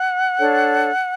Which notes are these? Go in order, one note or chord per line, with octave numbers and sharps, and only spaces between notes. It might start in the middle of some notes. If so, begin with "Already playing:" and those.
Already playing: F#5
D4 A4 C#5